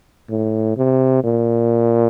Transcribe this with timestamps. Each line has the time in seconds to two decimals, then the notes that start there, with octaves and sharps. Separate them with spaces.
0.29 A2
0.77 C3
1.24 A#2